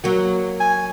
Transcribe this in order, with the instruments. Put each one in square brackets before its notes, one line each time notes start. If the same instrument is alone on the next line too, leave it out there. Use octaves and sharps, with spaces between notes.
[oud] F#3 A#3 F#4
[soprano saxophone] G#5